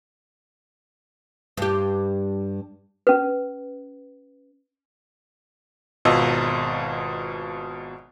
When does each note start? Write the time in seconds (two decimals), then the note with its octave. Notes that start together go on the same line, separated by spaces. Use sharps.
1.57 G2 G4
3.07 C#4 B4
6.05 G#1 B2 F4 D#5 E6